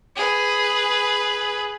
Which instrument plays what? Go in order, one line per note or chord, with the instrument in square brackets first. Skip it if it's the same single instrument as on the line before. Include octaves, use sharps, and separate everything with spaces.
[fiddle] G#4 B4